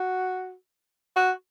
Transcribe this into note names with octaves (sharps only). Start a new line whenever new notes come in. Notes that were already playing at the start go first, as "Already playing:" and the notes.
Already playing: F#4
F#4